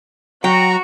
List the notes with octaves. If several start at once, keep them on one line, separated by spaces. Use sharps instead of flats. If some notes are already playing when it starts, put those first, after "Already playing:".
F#3 F#4 G5 A#5